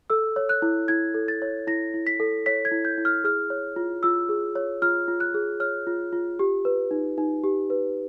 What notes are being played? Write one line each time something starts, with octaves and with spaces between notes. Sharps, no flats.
A4 E6
C#5
F#6
E4
E4 G#6
A4
A6
C#5
E4 A#6
E4
B6
A4
C#5 B6
G#6
E4
G6
E4
F6
G#4 F6
C#5
F4
F4 E6
G#4
C#5
F4 F6
F4
F#6
G#4
C#5 F6
F4
F4
G4
B4
D#4
D#4
G4
B4